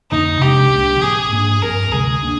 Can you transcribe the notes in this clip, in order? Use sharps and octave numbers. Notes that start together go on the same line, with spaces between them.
F2 D3 F3 A#3 D#4
C3 F3 G#3 D4 G4
C2 A#2 G#3 D4
A#2 F3 C4 G#4
G#2 F3 A#3 D4
G2 F3 C4 A#4
D2 C3 F3 G#3 G#4
A#3 D4